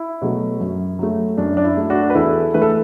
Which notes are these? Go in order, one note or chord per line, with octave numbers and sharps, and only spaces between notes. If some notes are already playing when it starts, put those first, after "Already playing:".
Already playing: E4
B2 F#3 A3
F#2
F#3 A3
F#2 D4
D4
E4
F#3 A3
D4 F#4
B4
E2 E4 A4
E3 A3 B4
A4